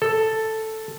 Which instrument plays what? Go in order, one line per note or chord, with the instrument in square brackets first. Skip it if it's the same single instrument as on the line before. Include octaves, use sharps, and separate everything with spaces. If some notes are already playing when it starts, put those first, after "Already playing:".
[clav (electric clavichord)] A4